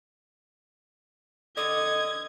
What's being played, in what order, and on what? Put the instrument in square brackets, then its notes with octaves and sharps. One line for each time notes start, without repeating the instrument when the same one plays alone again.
[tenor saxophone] D3 [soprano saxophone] D#5 [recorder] D#6 [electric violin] G#6